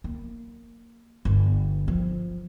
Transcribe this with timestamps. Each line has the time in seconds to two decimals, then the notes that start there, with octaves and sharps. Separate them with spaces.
0.04 A#3
1.25 G1
1.88 F3